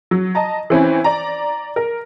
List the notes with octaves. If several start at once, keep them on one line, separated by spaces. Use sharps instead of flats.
F#3
D#5 A5 A#5
E3 C4 C#4 E4
D5 A#5
A#4